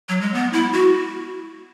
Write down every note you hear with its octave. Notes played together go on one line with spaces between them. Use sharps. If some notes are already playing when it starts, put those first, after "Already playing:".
F#3
G#3
B3
E4
F#4